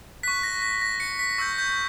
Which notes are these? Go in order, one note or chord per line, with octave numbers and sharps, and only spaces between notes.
C#6 F#6 B6
A#6
A#6
A#6
C#7
B6
C#6 E6 G6 A#6
G6